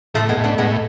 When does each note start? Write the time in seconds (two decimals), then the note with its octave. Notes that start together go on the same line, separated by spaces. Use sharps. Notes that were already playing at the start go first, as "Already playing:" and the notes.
0.14 A2 F3 A3
0.29 G#3 B3
0.37 A2
0.44 B3 D4
0.58 A2 G#3 B3